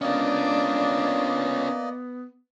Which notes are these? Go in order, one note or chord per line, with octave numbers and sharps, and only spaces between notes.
A#3 B3 C#4 D4 F4 D5 D#5